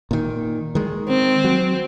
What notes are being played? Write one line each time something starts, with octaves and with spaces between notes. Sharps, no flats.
A#2 D#3
D#3 G#3
C4
F#3